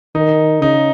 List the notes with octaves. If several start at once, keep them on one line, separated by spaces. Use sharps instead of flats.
D#3 D#4
C#3 D#4